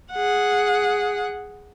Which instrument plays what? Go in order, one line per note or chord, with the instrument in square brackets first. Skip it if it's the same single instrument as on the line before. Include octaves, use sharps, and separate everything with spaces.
[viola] G#4 F#5